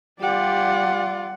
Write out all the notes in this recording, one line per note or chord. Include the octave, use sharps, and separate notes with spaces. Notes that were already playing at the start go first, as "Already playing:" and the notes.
G3 F4 G4 D5 F#5